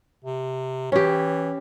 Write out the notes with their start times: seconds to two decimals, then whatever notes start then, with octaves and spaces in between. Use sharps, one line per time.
0.24 C3
0.92 E3 C#4 G4